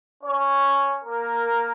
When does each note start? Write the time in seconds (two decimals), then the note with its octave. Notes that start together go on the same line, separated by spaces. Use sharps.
0.23 C#4 C#5
1.04 A#3 A#4